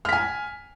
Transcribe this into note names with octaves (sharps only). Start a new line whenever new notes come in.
G#5 F6 B6